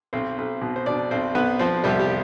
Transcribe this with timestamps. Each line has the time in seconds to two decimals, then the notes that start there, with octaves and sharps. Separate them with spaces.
0.13 B1 C4 C5
0.38 B1
0.61 B2
0.76 C5
0.86 B2 D4 D5
1.11 B1 C4 C5
1.35 B1 B3 B4
1.59 F3 C4 C5
1.84 C2 G3 G4
1.99 G4